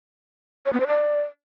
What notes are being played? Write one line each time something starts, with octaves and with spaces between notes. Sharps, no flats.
C#5
B3
C5
D5